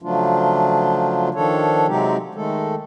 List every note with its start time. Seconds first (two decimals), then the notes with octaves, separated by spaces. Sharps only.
0.02 C#3 F3 F#3 A3 D4 F4
1.34 D#3 F3 D4 A4 C#5
1.87 C3 F#3 G#3 C4 D#4 G4
2.35 D#3 G#3 A3 A4